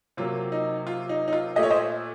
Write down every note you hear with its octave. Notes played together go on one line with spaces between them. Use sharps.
C3 F#3 A#3 F4
D#4
F4
D#4
D#4
F4
A#2 A3 D#5
C#5
C5 D#5